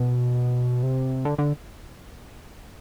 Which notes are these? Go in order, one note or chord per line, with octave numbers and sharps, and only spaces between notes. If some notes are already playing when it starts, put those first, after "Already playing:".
Already playing: B2
C3
D3
D3